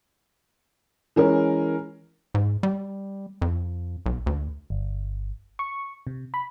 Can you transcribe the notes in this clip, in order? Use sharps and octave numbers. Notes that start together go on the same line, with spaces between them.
E3 G#3 C#4 A#4
G#2
G3
F2
B1
D2
G1
C#6
C3
B5